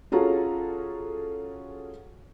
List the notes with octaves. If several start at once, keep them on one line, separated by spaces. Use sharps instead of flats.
C#4 F4 F#4 G#4 A4 A#5